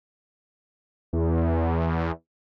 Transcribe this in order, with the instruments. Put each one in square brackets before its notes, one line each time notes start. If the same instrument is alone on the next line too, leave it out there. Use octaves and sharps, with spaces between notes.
[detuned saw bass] E2